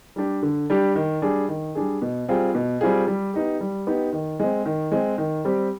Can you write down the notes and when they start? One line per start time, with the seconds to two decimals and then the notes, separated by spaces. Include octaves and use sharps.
0.16 G3 D4 G4
0.43 D3
0.70 G3 D4 G4
0.95 D#3
1.22 G3 D4 G#4
1.48 D#3
1.75 G3 D4 G#4
2.02 B2
2.29 G3 C4 F4 G#4
2.55 B2
2.81 G3 C4 F4 G#4
3.07 G3
3.34 B3 D#4 G4
3.61 G3
3.87 B3 D#4 G4
4.13 D#3
4.40 G#3 C4
4.66 D#3
4.92 G#3 C4
5.18 D#3
5.45 G3 C4 G4